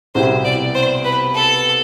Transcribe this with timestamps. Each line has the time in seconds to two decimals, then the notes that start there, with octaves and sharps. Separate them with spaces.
0.15 C2 B2 B3 E4 G4 C5
0.45 D5
0.75 C5
1.05 B4
1.35 A4